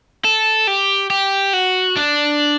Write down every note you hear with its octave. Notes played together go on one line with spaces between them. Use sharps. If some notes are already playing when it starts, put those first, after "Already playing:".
A4
G4
G4
F#4
D4